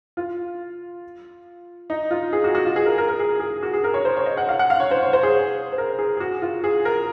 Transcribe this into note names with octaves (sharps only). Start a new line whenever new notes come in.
F4
D#4
F4
G#4
F#4
F#4
F4
G#4
A#4
A#4
A#4
G#4
G#4
F#4
G#4
A#4
C#5
C5
C#5
D#5
F#5
F5
F#5
F5
C#5
C5
C#5
C5
G#4
C5
A#4
G#4
G#4
F#4
F4
G#4
A#4